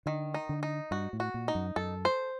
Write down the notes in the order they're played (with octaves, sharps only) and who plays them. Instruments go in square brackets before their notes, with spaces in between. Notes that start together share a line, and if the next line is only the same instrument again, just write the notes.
[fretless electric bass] D3 [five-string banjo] D#3
[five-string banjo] D#4
[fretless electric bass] D3
[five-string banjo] D#4
[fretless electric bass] G2 [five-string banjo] F#4
[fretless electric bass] A2
[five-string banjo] F#4
[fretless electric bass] A#2
[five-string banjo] D#4
[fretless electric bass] F#2
[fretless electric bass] F#2 [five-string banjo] A4
[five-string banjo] C5